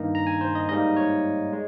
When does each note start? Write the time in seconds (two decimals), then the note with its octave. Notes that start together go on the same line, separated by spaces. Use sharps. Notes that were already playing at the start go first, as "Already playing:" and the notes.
Already playing: G2 D#3 A#3 D#4 A#5
0.15 A#5
0.27 G#5
0.41 C5
0.55 D#5
0.69 G#2 G3 A#3 D#4 D#5
0.96 C#5
1.53 G#3